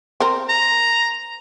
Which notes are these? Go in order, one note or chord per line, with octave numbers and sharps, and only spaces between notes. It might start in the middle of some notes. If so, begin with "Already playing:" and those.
C4 A#4
A#5